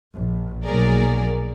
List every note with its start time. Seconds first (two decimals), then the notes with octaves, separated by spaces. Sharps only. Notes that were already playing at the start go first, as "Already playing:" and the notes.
0.14 A#1
0.65 B1 F#3 A#3 G#4 A#4 D5